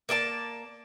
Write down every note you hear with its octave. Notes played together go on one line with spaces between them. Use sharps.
A#3 D5 D#5 A5